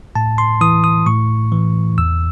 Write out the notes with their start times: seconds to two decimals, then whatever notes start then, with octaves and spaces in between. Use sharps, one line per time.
0.15 A2 A5
0.38 C6
0.61 E3 D#6
0.84 D#6
1.06 A2 C#6
1.52 E3
1.98 E2 E6